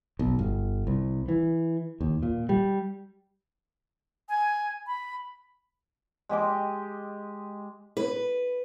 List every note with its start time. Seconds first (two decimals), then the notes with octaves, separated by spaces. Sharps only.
0.19 B1
0.39 G1
0.87 C2
1.28 E3
2.01 D#2
2.23 A#2
2.49 G3
4.29 G#5
4.87 B5
6.29 G#3 G4 D#5 D6
7.97 B4